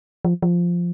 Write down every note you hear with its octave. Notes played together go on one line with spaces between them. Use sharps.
F3
F3